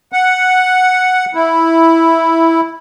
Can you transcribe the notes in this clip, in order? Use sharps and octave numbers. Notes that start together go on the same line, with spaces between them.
F#5
E4